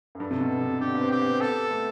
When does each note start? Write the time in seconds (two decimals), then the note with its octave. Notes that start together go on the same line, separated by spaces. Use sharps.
0.15 F#2
0.20 G2 A4
0.31 C3
0.41 B2
0.61 C3
0.80 D3 G4
0.95 B3
1.01 C4
1.11 G4
1.21 B3
1.32 C4
1.41 B3 A4
1.71 A3